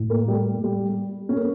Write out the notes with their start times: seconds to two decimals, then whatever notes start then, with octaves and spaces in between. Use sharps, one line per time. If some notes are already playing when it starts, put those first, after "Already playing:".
Already playing: A2
0.10 A#3
0.28 G3
0.64 G3
1.29 C#4
1.36 A#3